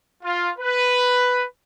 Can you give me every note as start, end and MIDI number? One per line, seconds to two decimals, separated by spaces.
0.24 0.51 65
0.59 1.45 71